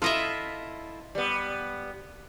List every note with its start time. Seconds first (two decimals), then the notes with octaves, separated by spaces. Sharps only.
0.02 E4 F4 A4 D#5 E5
1.15 G3 B3